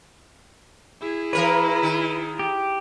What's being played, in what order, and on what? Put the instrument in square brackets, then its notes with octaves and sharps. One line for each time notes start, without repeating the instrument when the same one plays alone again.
[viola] E4 G#4
[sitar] E3 A#4 C#5 [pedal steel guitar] B4
[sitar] D#3
[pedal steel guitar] G4